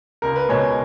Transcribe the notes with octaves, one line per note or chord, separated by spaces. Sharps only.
C#2 A#4
B4
B2 G#3 C#5